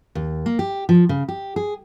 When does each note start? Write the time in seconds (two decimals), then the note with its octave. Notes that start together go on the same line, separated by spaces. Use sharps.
0.15 D#2
0.46 A#3
0.59 G4
0.89 F3
1.09 C#3
1.28 G4
1.56 G#4